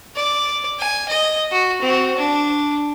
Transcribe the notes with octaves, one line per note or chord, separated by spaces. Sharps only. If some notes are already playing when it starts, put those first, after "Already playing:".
D5
G#5
D#5
F#4
C4 F#4
D4